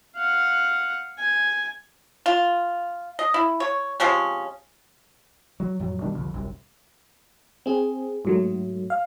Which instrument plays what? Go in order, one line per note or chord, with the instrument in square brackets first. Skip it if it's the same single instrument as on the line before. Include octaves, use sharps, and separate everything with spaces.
[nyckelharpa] F5 F#5
G#5
[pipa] F4
D#5
E4
C#5
C3 F3 G#3 C#4
[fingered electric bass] F#3
F2 A2 F#3
B2 D#3 G3 D4
C2 F2 D3
G1 C2 F#2 C3
[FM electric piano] C4 G#4
G#2 F#3 A3
F5